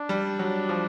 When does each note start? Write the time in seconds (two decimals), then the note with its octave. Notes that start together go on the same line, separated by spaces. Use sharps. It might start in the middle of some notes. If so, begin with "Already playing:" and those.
Already playing: D4
0.09 G3
0.39 F#3
0.69 F3